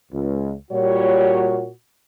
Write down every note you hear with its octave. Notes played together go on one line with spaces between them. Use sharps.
C#2
A#2 G3 F#4 C#5